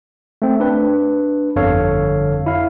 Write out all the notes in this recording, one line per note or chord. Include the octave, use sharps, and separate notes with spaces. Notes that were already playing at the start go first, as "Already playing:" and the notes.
A3 C4
D4 B4
G1 F2 D3 A4 C#5 F5
E4 F5